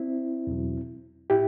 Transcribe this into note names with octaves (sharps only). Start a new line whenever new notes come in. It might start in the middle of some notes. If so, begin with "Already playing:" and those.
Already playing: C4 E4
E2 B2 F#3
A2 E4 G4